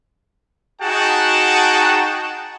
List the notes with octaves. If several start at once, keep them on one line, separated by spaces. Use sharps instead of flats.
D#4 F#4 G#4 F#5 G5 A5